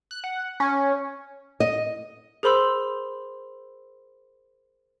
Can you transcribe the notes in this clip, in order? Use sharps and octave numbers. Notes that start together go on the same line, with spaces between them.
F#6
F#5
C#4
D#5
G#4 A#4 C5 B5 C6 E6